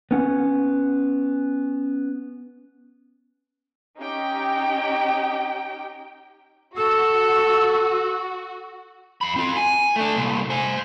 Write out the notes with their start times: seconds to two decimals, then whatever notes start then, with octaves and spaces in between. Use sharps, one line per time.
0.11 B3 C#4 F#5
3.98 C#4 D#4 G4 G5
6.77 F#4 A4 E6
9.21 F2 B5
9.36 C4 F4
9.57 G#5
9.96 A3 D4
10.16 C2 A#2
10.50 C5 G#5